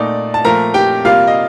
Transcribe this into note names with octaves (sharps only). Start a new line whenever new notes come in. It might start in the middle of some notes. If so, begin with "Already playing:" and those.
Already playing: A#2 A3 D#4 D5
A5
A#2 F3 A3 A#4 A#5
G4 G5
C3 G3 A#3 F4 F5
D#5